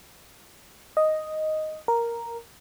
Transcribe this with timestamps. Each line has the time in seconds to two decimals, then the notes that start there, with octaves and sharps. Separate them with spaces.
0.97 D#5
1.88 A#4